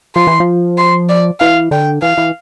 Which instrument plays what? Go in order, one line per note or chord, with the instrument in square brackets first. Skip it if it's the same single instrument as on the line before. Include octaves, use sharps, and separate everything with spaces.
[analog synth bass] F3 [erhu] C6
[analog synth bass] E3
F3
[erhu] C6
D5
[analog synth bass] E3 [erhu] F5
[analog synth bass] D3 [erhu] G5
[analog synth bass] E3 [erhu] F5
[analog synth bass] E3